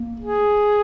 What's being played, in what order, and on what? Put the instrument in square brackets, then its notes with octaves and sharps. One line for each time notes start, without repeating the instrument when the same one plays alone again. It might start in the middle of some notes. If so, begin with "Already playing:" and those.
Already playing: [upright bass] A#3
[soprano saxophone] G#4